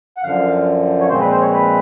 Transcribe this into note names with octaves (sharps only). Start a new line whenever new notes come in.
F#5
F#2 D3 F3 F5
C#5
A#2 F3 G#3 C4 C5
B4
C5
C#5
B4